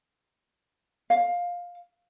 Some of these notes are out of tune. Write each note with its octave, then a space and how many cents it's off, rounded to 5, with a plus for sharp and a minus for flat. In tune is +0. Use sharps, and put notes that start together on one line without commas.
F5 +10